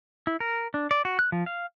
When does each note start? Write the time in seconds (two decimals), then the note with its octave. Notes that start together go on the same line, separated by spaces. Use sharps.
0.27 E4
0.40 A#4
0.74 D4
0.91 D5
1.05 F#4
1.19 F#6
1.32 F3
1.46 F5